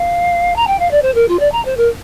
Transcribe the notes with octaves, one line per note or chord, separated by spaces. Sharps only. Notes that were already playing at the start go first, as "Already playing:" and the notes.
Already playing: F5
A#5
G5
F5
D5
C5
A#4
F4
D5
A#5
C5
A#4